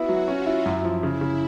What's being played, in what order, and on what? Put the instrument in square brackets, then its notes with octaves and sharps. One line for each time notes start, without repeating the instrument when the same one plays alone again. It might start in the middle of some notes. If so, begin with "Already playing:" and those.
Already playing: [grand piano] B3 E4 [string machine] F#4
[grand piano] F#3
[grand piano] C#4 [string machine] F4
[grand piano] E4
F#2
F3
[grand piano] C#3 [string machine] E4
[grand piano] C#3